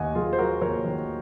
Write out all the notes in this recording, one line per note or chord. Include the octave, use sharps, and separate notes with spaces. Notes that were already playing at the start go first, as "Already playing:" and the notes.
Already playing: D#2 D#3 D#5 F#5 G#5
D#2 F4 G#4
C5
F#3 F#4 A#4
D#2 A#4 C#5
D#3